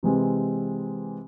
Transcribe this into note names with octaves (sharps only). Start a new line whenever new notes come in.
C3 E3 G#3 C4